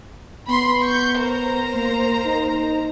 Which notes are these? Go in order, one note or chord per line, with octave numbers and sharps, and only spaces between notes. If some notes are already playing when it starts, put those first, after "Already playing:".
B3 B5 C6
C#6 G6
A#4 C5 A#5
A#3
D#4